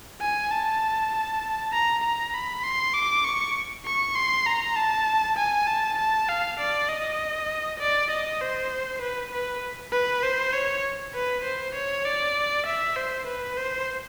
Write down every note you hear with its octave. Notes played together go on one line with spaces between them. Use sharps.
G#5
A5
A#5
A#5
B5
C6
D6
C#6
C#6
C6
A#5
A5
G#5
A5
A5
F5
D5
D#5
D5
D#5
C5
B4
B4
B4
C5
C#5
B4
C5
C#5
D5
E5
C5
B4
C5